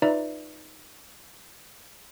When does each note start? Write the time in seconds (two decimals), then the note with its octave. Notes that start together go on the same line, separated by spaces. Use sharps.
0.02 D#4 F4 B4 D5 E5 A#5